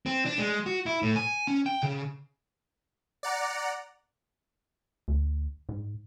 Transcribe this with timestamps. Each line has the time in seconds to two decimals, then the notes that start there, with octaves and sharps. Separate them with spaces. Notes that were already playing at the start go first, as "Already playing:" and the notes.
0.06 C4
0.25 D4
0.38 G#3
0.66 F#4
0.86 E4
1.02 A2
1.16 G#5
1.47 C#4
1.66 G5
1.83 C#3
3.23 D5 F#5 A#5
5.08 D2
5.69 G#2